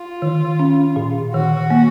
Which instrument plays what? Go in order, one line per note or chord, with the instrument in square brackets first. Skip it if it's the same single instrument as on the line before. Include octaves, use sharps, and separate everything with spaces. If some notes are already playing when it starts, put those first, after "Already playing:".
Already playing: [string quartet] F4
[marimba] D#3
C#4
A#2
[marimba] D#3 [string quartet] F#4
[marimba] A#3